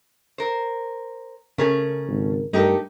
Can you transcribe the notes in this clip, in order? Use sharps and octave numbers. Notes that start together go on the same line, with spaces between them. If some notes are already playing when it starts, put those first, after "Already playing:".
A#4 C5
C#3 A3 C#4 G#4 A#4
G#1
G2 A3 D#4 G4 A4 A#4